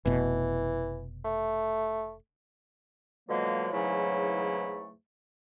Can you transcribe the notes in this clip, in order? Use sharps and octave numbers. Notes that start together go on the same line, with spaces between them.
F1 B2 E3
A3
B2 D3 F3 F#3 G#3 A#3
E2 G#2 C#3 F#3 A3 E4